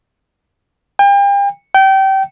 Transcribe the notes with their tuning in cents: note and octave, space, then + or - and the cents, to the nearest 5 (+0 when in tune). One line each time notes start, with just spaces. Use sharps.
G5 +40
G5 -25